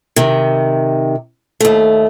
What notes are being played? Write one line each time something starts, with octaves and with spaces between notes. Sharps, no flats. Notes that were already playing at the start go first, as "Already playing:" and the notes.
C3 D#3
D#2 A3